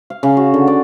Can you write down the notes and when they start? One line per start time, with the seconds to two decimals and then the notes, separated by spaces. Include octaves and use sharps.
0.10 F5
0.23 C#3
0.37 F#4
0.54 D3
0.67 D5